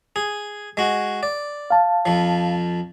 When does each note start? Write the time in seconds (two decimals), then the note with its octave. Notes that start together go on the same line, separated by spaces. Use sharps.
0.16 G#4
0.77 G#3 F#4
1.23 D5
1.70 F5 A5
2.06 F2 F3